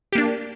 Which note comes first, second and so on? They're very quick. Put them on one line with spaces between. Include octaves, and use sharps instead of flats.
G4 A#3 D4